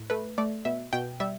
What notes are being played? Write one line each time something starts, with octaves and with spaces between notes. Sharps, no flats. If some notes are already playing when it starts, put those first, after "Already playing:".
Already playing: A2
A3 B4
A3 D5
B2 E5
B2 G5
G3 E5